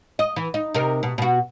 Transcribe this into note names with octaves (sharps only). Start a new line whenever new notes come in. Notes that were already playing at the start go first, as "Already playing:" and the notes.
D#5
E3
D#4
C3 D#4 A#4
B2
B2 F#4